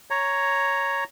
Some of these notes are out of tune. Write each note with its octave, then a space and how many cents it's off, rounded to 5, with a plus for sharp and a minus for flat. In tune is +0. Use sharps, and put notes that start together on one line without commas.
C#5 +0 A#5 +0